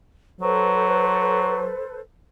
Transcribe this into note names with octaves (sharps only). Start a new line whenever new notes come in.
F#3 A4 B4 C5